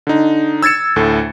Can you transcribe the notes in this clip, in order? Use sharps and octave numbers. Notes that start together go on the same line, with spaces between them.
D3 D#4
E6 G#6 A6 C#7 E7
D2 A2 A4